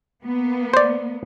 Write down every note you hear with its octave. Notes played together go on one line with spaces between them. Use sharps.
A#3 B3
C5 D5